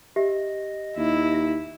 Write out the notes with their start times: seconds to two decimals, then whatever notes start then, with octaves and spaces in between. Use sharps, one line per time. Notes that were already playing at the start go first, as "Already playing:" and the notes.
0.16 G4 D#5 E5
0.97 D#2 E4